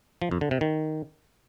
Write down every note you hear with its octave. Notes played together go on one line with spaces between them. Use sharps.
F3
F2
D3
C3
D#3